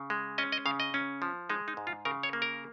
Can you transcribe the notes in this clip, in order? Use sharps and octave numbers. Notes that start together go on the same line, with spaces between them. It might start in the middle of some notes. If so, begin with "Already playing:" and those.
Already playing: C#3
G#3
C#4 D#5
D#5
C#3 F5
D#5
C#4
F3
G#3 D#4
D#4
G#2
F4
C#3 A#4
C#5
A#3
A#4